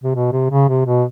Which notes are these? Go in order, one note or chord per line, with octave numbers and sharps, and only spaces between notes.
C3
B2
C3
C#3
C3
B2